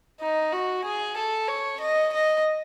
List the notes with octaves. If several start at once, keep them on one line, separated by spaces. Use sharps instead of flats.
D#4
F#4
G#4
A4
C#5
D#5
D#5